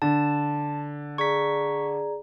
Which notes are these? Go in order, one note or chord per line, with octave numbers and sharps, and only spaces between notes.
D3 A5
G#4 D5 A#5 C#6 B6